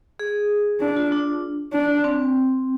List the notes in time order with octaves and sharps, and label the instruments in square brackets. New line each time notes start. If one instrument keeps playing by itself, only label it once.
[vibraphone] G#4
[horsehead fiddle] D4
[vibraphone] F4
D4
[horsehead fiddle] D4
[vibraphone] C4